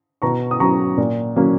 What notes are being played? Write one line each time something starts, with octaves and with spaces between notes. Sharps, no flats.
B2 A#5 C#6
D#6
F#3 C#4 A#5 C#6
A#2
F#3 A#3 C#4